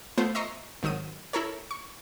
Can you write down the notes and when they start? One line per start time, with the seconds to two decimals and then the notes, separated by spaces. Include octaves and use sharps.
0.18 A3 B3 F4 C5
0.35 D#5 E5 A#5 C6 C#6
0.83 G#1 D#3 F#3 D#6 D#7
1.33 E4 A4 A#4 C#5
1.71 C#6